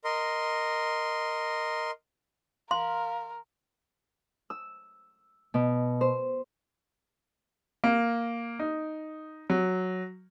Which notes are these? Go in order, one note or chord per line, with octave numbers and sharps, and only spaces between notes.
A#4 D#5 C6
A#4 F5 C6
E6
B2
C5
A#3
D#4
F#3